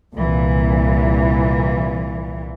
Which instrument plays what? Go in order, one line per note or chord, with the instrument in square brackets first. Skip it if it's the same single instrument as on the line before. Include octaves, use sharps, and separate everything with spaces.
[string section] C2 A#2 E3